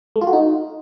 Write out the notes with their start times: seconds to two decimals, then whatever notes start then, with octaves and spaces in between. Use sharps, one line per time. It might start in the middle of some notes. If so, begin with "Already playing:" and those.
0.16 A3
0.21 F4
0.27 F#4
0.33 D#4